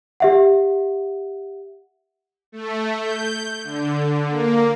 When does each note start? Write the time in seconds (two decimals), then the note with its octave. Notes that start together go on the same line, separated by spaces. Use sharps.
0.20 G4 E5 F#5
2.52 A3
3.00 G6
3.64 D3
4.29 A#3